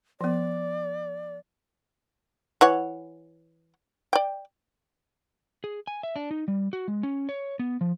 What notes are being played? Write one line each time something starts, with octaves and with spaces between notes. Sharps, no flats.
F3 B3 D5
E3 C#5 F#5
D5 G5
G#4
G#5
E5
D4
D#4
G3
F#4
G#3
C#4
C#5
B3
F3